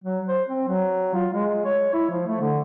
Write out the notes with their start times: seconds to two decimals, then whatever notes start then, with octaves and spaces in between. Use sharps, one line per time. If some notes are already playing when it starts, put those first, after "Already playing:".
0.04 F#3
0.29 C5
0.48 C4
0.68 F#3
1.14 F4
1.33 G#3
1.66 C#5
1.93 E4
2.10 F3
2.27 A3
2.41 D3